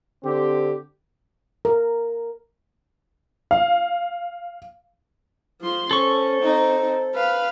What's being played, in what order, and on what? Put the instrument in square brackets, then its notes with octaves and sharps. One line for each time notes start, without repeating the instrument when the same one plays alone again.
[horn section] D3 C4 G4
[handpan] A#4
[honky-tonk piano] F5
[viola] F3 C6
[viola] C#4 [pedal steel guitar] A4 C#6 [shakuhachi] C5
[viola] C4 [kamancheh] D#4
[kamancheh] B4 [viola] F5